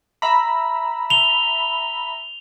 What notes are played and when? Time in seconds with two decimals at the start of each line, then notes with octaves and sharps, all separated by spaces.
0.22 E5 A#5 B5
1.10 F7 G7